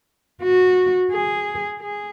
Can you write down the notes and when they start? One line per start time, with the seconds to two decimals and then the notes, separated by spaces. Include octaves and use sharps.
0.43 F#4
1.12 G#4
1.81 G#4